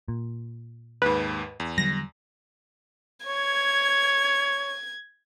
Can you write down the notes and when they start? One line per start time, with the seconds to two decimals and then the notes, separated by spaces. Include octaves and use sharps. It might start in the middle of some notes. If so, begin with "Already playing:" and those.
0.08 A#2
1.02 D#2 G#2 B4
1.60 E2
1.78 D3 F#3 G3 A#6
3.27 C#5 G#6